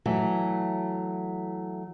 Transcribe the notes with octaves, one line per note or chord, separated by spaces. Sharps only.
E3 F#3 A3